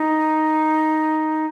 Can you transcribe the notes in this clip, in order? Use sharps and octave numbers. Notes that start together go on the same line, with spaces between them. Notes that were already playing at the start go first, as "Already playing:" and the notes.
Already playing: D#4